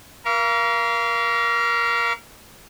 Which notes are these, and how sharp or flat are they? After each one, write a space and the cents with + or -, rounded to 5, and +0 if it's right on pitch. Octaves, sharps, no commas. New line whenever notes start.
A#4 +25 F5 -25 D6 -45